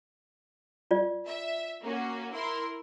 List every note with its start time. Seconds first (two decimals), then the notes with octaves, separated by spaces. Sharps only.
0.91 F4 D5
1.27 E5
1.84 A#3 C#4 F#4
2.32 E4 A#4 C6